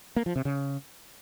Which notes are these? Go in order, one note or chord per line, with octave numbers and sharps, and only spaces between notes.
A#3
F3
C3
C#3